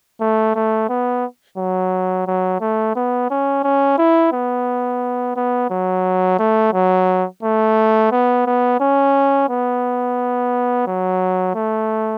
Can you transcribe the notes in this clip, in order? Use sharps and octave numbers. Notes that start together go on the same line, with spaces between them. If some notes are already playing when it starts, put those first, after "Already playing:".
A3
A3
B3
F#3
F#3
A3
B3
C#4
C#4
E4
B3
B3
F#3
A3
F#3
A3
B3
B3
C#4
B3
F#3
A3